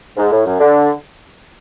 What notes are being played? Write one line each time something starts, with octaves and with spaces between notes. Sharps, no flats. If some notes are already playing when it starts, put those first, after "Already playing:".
G#2
A2
F#2
D3